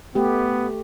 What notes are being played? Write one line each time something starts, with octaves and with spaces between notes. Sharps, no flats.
A3 B3 G4